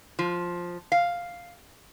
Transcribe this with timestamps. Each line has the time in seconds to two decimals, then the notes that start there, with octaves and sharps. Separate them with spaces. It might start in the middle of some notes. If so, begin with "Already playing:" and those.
0.19 F3
0.92 F5